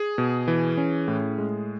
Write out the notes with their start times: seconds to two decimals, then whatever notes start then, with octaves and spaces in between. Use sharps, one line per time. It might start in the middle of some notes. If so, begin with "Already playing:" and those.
Already playing: G#4
0.18 B2
0.48 E3
0.77 C#4
1.08 A2
1.38 G#3